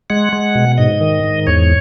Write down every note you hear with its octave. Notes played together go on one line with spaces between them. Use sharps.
G#3 F#5
G#3
B2
G#2 D#5
D#3
G#2
E2 C#5